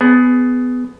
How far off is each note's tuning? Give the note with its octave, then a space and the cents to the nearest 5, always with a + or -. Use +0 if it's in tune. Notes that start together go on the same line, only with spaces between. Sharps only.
B3 +20 G#4 +15